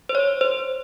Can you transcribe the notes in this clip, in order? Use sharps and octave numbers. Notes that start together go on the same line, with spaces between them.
C5
C#5
C5